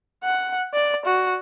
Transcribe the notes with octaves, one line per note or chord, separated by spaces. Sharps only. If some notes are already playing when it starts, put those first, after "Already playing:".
F#5
D5
F#4